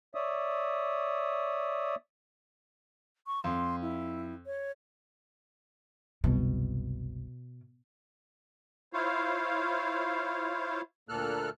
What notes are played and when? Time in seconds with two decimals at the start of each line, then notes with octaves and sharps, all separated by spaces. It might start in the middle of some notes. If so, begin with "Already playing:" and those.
0.15 C#5 D5 E5 D#6
3.27 C#6
3.44 F2 C6
3.82 E4
4.46 C#5
6.24 F#1 C2 B2
8.93 E4 F4 C5 C#5 F5
11.09 D2 A#2 A#3 A4 F6 F#6